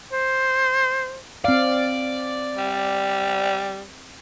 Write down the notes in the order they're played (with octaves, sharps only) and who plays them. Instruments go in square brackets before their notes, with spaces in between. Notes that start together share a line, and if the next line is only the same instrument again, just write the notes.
[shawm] C5
[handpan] C4 F5 [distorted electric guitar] D5
[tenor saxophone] G3